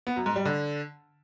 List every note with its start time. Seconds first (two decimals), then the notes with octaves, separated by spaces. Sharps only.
0.07 B3
0.16 F#2
0.26 G#2
0.36 G3
0.45 D3